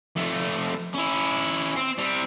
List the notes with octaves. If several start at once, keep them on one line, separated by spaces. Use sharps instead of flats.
F2 A3
C#4 E4
C4
G3 C4